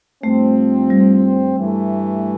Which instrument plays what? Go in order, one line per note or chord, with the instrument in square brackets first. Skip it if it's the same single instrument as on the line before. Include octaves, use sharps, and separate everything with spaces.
[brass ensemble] G2 F3 C4 [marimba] A3
[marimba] G3
[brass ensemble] G2 E3 A3